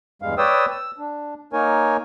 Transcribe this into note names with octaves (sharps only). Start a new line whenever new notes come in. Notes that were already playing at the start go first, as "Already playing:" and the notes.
E2 G2 G3 G#3 F5
B4 C#5 D5 G5 D#6 E6
E6
D4
A#3 D#4 A#4 C#5 G#5